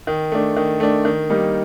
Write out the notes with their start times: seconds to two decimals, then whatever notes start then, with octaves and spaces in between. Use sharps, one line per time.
0.07 D#3
0.32 A3 D4
0.57 D#3
0.80 A3 D4
1.05 D#3
1.30 G3 A#3 D#4